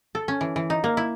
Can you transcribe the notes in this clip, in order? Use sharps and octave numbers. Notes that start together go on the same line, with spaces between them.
A4
C#4
E3
E3
D#4
A#3
E4